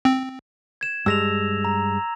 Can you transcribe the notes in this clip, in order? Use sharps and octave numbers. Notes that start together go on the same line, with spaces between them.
C4
G#6 E7
G2 G#3 E6 A#6 F7
A#5